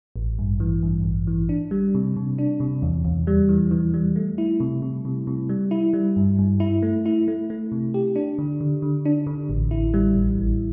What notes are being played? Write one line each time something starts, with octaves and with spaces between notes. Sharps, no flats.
A1
G2
E3
G2
A1
E3
D4
G3
C3
C3
D4
C3
E2
E2
G3
E3
E3
G3
A3
E4
C3
C3
C3
C3
G3
E4
G3
G2
G2
E4
A3
E4
A3
A3
C3
G4
D4
D3
D3
D3
D4
D3
A1
E4
G3
A1
A1